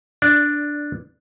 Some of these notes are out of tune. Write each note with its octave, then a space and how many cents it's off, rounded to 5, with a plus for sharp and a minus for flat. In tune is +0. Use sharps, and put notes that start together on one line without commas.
D4 +0 D5 -15